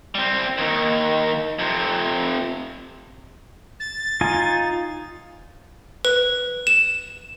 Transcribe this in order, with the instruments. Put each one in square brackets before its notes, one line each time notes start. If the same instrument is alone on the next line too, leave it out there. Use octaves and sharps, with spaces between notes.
[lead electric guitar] G3 C4
D#2 D#3
F2 C3
[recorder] A6
[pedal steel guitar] D#4 F4 G#5
[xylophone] B4
E7